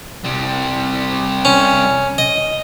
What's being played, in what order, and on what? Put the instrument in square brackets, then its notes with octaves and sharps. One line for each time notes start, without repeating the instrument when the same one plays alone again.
[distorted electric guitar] C2 G3
[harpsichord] C#4
D#5